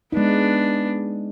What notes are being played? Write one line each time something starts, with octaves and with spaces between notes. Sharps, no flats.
G#3 B3 D4 D#4